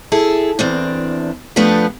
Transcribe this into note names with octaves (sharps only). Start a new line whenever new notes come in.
E4 G#4 A4
E2 C4 D4
F3 A3 B3 D4 G4 B4